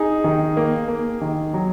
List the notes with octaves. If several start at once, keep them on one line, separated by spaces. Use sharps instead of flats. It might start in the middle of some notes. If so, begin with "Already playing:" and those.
Already playing: D#4 G#4
D#3
A#3
A#3
D#3
F#3